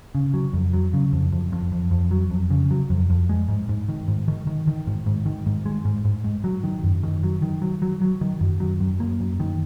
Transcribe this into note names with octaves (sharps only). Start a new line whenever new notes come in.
C#3
F#3
F2
F#3
C#3
F2
F2
F2
F2
F2
F#3
F2
C#3
F#3
F2
F2
G#3
G#2
G#2
D#3
G#2
D#3
D#3
D#3
G#2
G#2
D#3
G#2
G#3
G#2
G#2
G#2
F#3
D#3
F#2
D#3
F#3
D#3
F#3
F#3
F#3
D#3
F#2
F#3
F#2
A#3
F#2
D#3